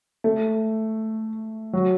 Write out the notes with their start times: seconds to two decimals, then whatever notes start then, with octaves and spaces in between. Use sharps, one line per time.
0.24 A3
1.73 F#3